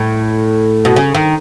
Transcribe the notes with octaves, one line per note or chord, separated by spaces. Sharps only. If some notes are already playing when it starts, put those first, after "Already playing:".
Already playing: A2
B2
C#3
D#3